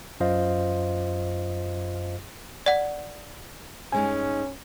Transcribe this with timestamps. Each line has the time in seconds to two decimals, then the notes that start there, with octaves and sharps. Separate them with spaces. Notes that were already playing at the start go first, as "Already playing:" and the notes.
0.20 F#2 F4 C5 D#5 F5
2.66 D5 F#5
3.92 G2 G#3 C#4 D#4 G#5